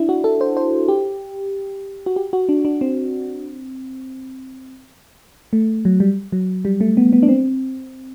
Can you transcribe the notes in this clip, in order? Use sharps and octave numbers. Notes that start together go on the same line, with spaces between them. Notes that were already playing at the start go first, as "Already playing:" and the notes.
Already playing: D4 E4
F#4
A4
C5
C5
G4
F#4
G4
F#4
D4
D4
C4
A3
F#3
G3
F#3
G3
A3
B3
B3
D4
C4